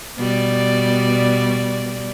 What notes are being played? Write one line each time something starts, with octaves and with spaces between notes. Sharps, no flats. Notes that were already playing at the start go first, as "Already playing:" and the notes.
B2 G3 D5